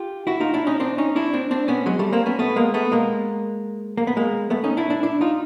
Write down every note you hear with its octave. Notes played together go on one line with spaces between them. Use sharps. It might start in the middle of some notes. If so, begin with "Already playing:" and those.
Already playing: F4 G4
E4 F#4
D#4 F4
D4 E4
C#4 D#4
C4 D4
C#4 D#4
D4 E4
C4 D4
C4 D4
B3 C#4
F#3 G#3
G3 A3
A#3 C4
B3 C#4
A3 B3
G#3 A#3
A3 B3
G#3 A#3
A#3
B3
G#3 A#3
A3 B3
C#4 D#4
D4 E4
D4 E4
D4 E4
D#4 F4